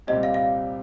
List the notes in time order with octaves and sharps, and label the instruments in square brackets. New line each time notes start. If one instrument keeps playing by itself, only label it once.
[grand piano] C2 A#2 G3 C4 G4 [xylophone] D#5
[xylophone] F5
F5